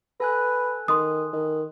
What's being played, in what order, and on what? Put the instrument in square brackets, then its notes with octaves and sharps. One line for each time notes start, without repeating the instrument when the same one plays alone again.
[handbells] A4 G#5 F#6 [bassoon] B4
[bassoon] D#3 [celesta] C6 D#6
[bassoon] D#3